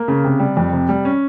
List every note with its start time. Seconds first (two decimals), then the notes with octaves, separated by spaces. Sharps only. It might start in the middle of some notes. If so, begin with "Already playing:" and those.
Already playing: A#3
0.08 C#3
0.24 C3
0.40 G3
0.57 F2
0.73 C3
0.89 G3
1.05 C#4